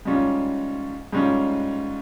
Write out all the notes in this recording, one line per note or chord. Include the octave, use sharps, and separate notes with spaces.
G#2 G3 C#4 F4
G#2 G3 C#4 F4